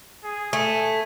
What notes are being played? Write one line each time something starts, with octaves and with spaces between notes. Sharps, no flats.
G#4
A3 G#5